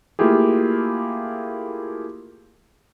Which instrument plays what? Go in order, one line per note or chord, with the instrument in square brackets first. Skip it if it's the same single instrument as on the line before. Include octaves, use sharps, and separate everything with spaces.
[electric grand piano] A3 A#3 E4 F4 G4 G#4